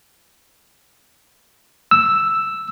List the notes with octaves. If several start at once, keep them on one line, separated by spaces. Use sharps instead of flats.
E6